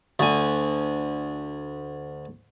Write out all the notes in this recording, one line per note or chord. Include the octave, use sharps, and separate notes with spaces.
D2 G#5